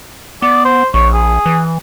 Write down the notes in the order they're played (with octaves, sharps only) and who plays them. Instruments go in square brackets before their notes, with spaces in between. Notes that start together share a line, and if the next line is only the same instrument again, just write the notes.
[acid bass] B3 [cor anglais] D5
[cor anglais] C5
[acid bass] A#1 [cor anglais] C#5
[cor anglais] G#4
[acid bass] E3